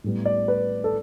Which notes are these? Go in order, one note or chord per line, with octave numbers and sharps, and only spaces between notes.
A2 G3 B3
D5
B4
A4